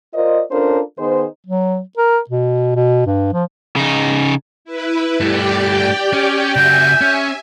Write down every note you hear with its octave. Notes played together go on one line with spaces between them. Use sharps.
F4 A#4 C5 D5 D#5
C#4 D4 F4 A4 A#4 C5
D#3 B3 D#4 G#4 C5
F#3
A#4
B2
B2
G2
F3
C#3 D#4
E4 B4
G2 A3 G4 D5 G5
C#4
C#3 F#4 E5 G#5 G6
C#4